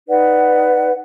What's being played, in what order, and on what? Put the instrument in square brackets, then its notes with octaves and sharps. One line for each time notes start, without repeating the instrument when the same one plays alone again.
[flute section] D#4 B4 D5 F#5